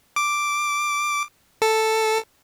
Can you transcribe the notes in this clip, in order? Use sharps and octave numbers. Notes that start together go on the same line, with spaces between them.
D6
A4